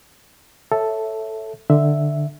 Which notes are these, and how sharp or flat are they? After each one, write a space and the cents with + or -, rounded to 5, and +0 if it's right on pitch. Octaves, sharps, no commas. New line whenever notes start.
A4 +0 C#5 +0 E5 +0
D3 +10 E5 +0